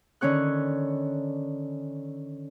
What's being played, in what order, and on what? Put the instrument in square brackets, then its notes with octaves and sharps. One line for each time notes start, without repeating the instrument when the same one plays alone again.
[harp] D3 D#3 C#4 C#5 F#6